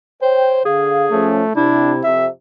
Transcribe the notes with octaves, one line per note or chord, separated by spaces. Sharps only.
C5 C#5 G5
D3 G#4 F5
F3 A3 C#4
C3 D4 E4
F2 C3 E5